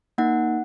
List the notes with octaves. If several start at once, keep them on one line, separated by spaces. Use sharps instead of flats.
A#3 D#4 F#5